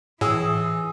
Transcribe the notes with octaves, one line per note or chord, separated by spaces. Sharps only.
A2 E3 G#4 C#6 E6